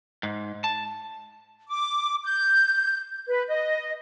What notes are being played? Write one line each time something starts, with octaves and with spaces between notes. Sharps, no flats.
G#2
A5
D6
G6
B4
D#5